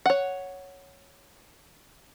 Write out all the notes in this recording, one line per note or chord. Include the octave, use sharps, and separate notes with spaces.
C#5 F#5